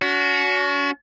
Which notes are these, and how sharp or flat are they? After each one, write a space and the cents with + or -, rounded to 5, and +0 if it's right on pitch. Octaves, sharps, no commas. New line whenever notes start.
C#4 +45 F#4 +0